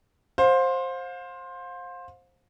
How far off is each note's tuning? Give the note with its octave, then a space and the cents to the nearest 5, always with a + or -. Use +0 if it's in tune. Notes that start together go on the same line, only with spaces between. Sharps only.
C5 +15 F5 +35